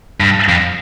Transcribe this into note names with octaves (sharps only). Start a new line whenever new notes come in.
G2
F2